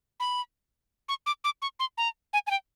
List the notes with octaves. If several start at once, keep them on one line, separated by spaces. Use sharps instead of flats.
B5
C#6
D6
D6
C#6
C6
A#5
G#5
G#5
G5